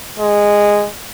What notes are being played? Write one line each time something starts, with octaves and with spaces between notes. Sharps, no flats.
G#3